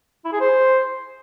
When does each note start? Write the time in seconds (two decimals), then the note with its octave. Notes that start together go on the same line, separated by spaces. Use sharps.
0.25 E4
0.33 G#4
0.40 C5